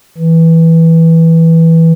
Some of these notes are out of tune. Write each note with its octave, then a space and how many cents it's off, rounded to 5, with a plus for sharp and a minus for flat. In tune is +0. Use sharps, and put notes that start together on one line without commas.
E3 -10